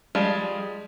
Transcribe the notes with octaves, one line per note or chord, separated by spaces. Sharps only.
F3 G3 G#3